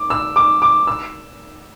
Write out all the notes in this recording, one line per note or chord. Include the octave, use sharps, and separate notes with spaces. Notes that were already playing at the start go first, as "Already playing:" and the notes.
Already playing: D6
E6
D6
D6
E6